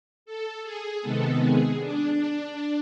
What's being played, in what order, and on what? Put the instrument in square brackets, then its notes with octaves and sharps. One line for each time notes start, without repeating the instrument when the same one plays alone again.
[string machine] A4
G#4
C3 D#3 G#3 B3 A4
G#4
D4